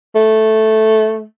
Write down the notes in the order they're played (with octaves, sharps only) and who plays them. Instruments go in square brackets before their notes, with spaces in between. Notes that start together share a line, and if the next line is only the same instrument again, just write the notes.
[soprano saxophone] A3